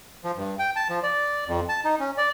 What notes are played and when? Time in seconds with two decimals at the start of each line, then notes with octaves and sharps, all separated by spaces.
0.24 F3
0.36 G2
0.59 G5
0.76 A5
0.89 F3
1.03 D5
1.48 F2
1.69 A5
1.85 D#4
2.00 C#4
2.17 D5